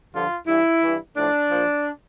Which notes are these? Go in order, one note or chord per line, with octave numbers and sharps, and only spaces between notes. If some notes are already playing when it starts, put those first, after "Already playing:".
G2 D3 F3 F4
G2 E3 E4
G2 E3
A2 F3 D4
A#2 F3